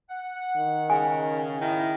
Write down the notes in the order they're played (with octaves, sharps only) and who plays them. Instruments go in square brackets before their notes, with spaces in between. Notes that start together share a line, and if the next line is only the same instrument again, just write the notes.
[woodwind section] F#5
[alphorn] D#3
[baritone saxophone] C#3 [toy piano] G#5
[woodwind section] A2 [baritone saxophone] D#3 [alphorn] E4